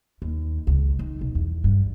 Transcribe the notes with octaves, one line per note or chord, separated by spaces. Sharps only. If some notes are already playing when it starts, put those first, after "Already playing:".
D#2
C#2
D#3
B1
E2
G2